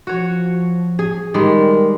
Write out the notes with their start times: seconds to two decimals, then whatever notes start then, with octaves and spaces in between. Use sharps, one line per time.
0.07 F3 F#4 C#5
0.99 G#4
1.34 D#3 G3 G#3 A#4